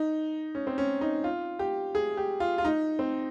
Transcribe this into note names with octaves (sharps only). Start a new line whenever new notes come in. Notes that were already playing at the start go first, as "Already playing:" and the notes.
Already playing: D#4
C#4
C4
C#4
D#4
F4
G4
G#4
G4
F4
F4
D#4
C4